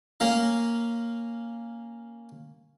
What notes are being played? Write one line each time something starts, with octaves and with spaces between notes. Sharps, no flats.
A#3 C#4 F5 A#5